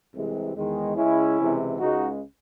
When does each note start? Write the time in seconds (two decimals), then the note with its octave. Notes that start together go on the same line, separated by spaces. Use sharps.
0.14 C2 C3 E3 G#3
0.56 E2 D#3 G#3
0.96 C#2 C#3 G#3 C#4 E4
1.38 C#2 C3 E3 G#3
1.79 C#2 C#3 G#3 D#4 F#4